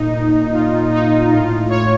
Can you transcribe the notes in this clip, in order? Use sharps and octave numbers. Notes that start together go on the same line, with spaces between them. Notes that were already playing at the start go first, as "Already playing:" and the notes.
Already playing: A#2 D#4
A#2 F4
D#4
A2 F4
C#5